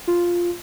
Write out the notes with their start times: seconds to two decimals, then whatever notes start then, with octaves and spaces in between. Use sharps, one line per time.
0.07 F4